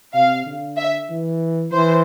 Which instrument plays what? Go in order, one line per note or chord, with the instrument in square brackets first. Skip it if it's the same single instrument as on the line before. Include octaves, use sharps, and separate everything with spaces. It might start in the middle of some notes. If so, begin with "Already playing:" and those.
[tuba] C3 [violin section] F5
[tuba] D3
[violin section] E5
[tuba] E3
[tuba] E3 [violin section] C5